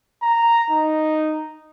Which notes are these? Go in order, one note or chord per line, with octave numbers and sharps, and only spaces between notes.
A#5
D#4